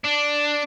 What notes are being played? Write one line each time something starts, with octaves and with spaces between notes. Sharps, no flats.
D4